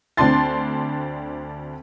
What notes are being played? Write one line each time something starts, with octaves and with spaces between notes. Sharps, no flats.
D2 C4 D4 A5 C6 A6